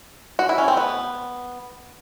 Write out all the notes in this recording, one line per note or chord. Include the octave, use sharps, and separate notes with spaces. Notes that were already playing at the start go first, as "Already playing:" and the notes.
F#4
E4
C#4
C4
B3